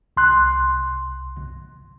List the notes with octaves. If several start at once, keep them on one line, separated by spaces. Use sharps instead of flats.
C2 C6 F#6